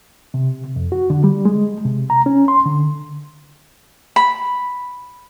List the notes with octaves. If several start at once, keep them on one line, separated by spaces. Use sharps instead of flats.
C3
F2
F#4
D3
G3
G#3
C3
A#5
C#4
C6
D3
B5